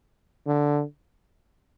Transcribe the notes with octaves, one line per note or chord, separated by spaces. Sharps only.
D3